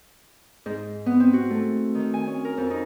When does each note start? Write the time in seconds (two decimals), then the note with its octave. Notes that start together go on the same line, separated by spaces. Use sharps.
0.66 G#2
1.06 B3
1.20 C4
1.33 F#4
1.51 A3
1.95 D#3
2.14 G#5
2.27 C#4
2.45 A#4
2.58 F2
2.71 D#4